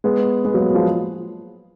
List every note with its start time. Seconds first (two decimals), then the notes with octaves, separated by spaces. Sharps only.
0.04 G#3 B3
0.45 G#3 B3
0.54 F#3 A#3
0.74 F3 G#3